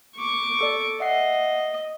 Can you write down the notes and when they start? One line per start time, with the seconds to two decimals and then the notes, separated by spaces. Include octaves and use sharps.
0.16 C#6 D6
0.61 A4 D5
1.00 D#5 E5 F#5 C7